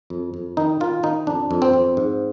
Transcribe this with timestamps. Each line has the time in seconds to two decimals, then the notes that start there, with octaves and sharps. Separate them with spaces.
0.10 F2
0.34 F2
0.57 D#3 D#4
0.80 D#3 F4
1.03 D#3 D#4
1.27 F2 D4
1.51 F2
1.62 C4
1.73 F2
1.97 G#2